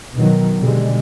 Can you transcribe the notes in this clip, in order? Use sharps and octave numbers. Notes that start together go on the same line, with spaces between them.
B2 D#3 F#3
B2 D3 G3 G#3